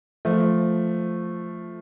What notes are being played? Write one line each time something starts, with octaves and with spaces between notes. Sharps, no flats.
F3 A3